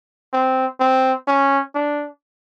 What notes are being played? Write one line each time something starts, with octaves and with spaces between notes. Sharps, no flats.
C4
C4
C#4
D4